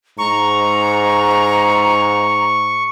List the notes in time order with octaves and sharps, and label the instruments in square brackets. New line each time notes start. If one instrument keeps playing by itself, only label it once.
[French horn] G#2 [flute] A#5 [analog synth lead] C#6